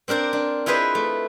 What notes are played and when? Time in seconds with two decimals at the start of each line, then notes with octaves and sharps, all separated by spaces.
0.08 C4 D4 A#4 C5 D5
0.33 D4
0.66 E4 F4 G#4 B4 C5 D#5
0.95 A3